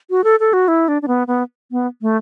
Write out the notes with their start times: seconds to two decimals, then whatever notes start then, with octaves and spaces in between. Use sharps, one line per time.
0.10 F#4
0.24 A4
0.40 A4
0.53 F#4
0.68 E4
0.88 D4
1.02 D4
1.08 B3
1.27 B3
1.71 B3
2.02 A3